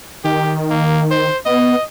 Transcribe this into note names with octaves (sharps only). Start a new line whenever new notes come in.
D#3 G4
A#3
C5
B3 D#5